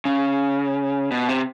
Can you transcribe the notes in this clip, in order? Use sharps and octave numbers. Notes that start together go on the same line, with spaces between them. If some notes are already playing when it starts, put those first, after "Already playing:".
C#3
B2
C3